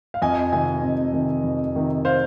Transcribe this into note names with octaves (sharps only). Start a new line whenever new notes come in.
F5
F2 D#5 G#5
C3 D#3 D#5 G#5
F2
C3 D#3
F2
C3 D#3
C5 F5